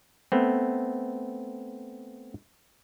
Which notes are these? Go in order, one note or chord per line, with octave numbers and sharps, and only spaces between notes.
A3 B3 C4